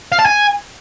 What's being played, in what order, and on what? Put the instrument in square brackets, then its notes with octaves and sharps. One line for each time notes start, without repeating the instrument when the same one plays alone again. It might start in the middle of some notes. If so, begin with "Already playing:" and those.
[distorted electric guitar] F5
A5
G#5